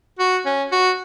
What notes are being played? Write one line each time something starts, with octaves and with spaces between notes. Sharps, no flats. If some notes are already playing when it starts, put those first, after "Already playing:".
F#4
C#4
F#4